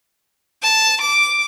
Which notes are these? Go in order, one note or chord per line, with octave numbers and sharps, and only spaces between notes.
A5
D6